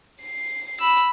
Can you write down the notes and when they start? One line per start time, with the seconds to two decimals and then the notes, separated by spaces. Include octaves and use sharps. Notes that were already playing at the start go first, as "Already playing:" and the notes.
0.22 C7
0.80 B5 E6